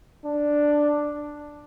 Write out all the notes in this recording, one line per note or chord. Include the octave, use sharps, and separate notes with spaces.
D4